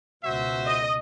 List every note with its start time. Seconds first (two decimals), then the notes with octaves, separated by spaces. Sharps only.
0.24 C#2 B2 F#4 C5 E5
0.66 D#5